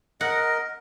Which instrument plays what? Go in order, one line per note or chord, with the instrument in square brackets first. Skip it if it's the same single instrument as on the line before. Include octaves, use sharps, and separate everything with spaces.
[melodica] A#4 D#5 [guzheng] F#5